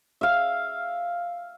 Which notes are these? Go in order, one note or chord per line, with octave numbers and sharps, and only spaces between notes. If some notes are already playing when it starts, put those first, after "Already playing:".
E5 F5